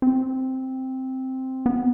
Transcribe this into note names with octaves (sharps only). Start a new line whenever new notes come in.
C4
B3